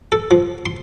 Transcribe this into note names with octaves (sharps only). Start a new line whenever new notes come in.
A4
F3
C6